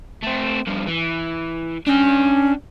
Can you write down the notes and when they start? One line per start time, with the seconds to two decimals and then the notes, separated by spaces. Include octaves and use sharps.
0.23 A3 C4
0.67 G2 F3
0.87 E3
1.87 C#4 D4 G5